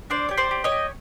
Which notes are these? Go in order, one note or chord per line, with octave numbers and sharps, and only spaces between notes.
D4 C5 D5
G4 C#5
C5 D5
G4
C#5 D#5
G4